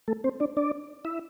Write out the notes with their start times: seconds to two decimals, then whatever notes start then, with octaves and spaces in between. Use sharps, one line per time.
0.08 A3 A4
0.24 C4 C5
0.40 D4 D5
0.57 D4 D5
1.05 E4 E5